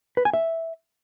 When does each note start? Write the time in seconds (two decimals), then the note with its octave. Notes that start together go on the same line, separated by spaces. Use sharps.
0.17 B4
0.25 G#5
0.34 E5